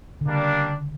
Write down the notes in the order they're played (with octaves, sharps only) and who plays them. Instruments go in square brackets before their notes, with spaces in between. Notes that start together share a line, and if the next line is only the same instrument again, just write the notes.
[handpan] D3
[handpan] C#3 [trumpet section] G3 A#3 D4